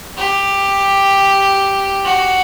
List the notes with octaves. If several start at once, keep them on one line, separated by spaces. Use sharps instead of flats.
G4
F#4